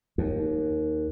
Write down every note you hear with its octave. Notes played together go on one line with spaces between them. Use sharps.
D#2